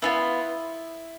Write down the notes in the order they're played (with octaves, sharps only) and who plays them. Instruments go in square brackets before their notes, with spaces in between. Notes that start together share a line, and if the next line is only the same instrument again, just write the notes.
[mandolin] B3 D4 F4 [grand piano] E4